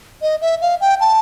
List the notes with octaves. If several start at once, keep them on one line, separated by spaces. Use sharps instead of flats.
D#5
E5
F5
G5
A5